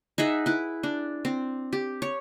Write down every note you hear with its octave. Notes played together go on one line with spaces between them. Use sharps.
D#4 G#4 E5 F#5
E4 B4
D4
C4
G4
C#5